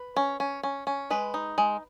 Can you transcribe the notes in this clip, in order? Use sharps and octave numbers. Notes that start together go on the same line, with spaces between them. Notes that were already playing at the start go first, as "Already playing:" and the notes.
Already playing: B4
C#4
C#4
C#4
C#4
G#3 B4
D#4
G#3